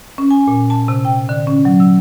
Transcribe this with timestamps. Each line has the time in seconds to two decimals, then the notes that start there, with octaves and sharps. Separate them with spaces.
0.18 C#4
0.31 G#5
0.48 A#2
0.70 A5
0.88 C3
1.05 G5
1.29 D3
1.47 C#4
1.65 F#3
1.80 E6